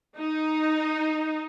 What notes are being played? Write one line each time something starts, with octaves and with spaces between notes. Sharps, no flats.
D#4